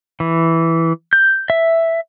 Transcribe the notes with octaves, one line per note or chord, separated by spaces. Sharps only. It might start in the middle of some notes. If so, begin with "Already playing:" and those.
E3
G6
E5